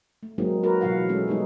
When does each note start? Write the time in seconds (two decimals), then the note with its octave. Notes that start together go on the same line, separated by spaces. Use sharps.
0.23 A3
0.38 F#3 G#3 A#3 C4 D#4
0.63 F#4 A#4 B4
0.81 B2 E3 F#3 F4 F5 F#5
1.09 G#3 A3 C#4 A4
1.28 G3 G#3 B3 D#4